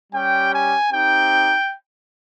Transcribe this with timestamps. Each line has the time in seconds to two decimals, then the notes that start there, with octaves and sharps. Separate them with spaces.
0.13 G3 C#4 G4 G5
0.52 G#5
0.92 C4 D#4 G4 G5